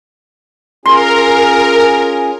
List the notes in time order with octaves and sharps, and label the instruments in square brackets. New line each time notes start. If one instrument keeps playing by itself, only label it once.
[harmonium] C#4 F4 G#4 [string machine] A#4 [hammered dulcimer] C6